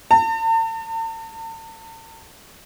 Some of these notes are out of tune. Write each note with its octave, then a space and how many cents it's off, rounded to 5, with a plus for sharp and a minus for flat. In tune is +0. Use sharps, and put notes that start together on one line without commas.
A5 +45